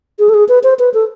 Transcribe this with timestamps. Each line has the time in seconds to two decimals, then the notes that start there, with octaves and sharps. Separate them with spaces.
0.19 G#4
0.29 A4
0.34 G#4
0.49 B4
0.64 C5
0.79 B4
0.94 A4